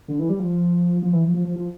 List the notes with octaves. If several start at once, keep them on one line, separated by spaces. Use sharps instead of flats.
D3
E3
G3
F3
F3
E3
F3
F3
F3
F3